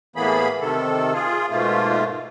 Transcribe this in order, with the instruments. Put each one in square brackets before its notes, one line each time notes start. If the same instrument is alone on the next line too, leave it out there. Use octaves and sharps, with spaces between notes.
[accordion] A2 E3 A#3 B3 G#4 B5
C3 D#3 A4
F4 G#4
G#2 B2 A3 A#3 F4